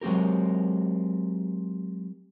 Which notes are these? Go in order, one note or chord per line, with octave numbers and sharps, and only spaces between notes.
F#3 G#3 C4 G4 A#4